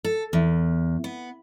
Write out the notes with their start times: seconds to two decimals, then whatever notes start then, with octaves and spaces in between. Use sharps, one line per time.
0.04 A4
0.33 E2
1.04 B3